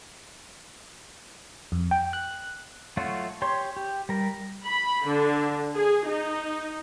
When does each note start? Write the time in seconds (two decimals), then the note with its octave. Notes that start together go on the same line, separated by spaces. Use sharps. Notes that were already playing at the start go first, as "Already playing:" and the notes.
1.72 F2
1.91 G5
2.13 F#6
2.97 F#3 A3 F4 F#4
3.42 G4 C#5 C6
3.77 G4
4.09 G3 A#4
4.64 B5
5.06 D3
5.76 G#4
6.08 D#4